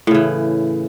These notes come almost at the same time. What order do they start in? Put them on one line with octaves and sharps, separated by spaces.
A2 C#3 E3